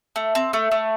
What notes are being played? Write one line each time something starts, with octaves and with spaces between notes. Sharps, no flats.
A3
C4
A3
A3